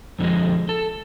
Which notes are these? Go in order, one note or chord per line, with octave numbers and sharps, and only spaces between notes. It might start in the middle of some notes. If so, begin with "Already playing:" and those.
F2 D3 F3 G#3
A4